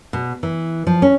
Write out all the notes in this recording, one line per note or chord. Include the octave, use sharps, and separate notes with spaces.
B2
E3
F3
C#4